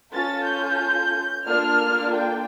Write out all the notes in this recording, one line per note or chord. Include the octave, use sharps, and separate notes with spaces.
C#4 F4 A4 A6
G6
A#3 D4 F4 A4 F6
G5